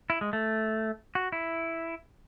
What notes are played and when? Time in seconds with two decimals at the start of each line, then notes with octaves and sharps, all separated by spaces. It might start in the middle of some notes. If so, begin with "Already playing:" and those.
0.10 E4
0.21 G#3
0.33 A3
1.15 F#4
1.32 E4